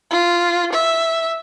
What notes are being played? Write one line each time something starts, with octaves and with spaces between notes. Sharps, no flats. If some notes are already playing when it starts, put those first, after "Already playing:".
F4
E5